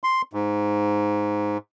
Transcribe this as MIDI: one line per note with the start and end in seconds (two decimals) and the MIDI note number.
0.04 0.22 84
0.33 1.58 44